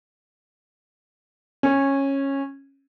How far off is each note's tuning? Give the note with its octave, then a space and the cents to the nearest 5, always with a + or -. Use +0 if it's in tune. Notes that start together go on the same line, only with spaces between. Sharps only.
C#4 -15